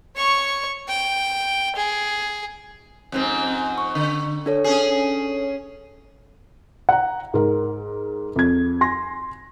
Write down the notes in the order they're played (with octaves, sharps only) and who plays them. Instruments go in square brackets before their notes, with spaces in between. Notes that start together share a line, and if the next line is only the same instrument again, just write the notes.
[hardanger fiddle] C#5 C#6
G5
G#4
[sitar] F2 G#2 C4
[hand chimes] C#6
[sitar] D3
[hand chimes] D4 A4 C#5
[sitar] C#4 G#4
[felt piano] F#5 A#5
G#2 A#4
F2 G#6
G#5 C6 A#6